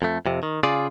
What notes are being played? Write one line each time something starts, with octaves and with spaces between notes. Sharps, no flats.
F2 A3
F2 C3
D#3
C#3 F4 G#4 D5